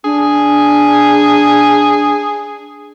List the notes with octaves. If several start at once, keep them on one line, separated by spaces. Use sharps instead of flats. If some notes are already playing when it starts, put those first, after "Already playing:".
D4 G#4